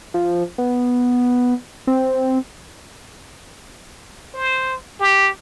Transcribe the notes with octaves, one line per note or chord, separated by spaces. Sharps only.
F3
B3
C4
C5
G4